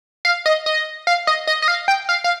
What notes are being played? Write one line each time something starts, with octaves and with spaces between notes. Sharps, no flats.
F5
D#5
D#5
F5
D#5
D#5
D#5
F5
G5
F5
F5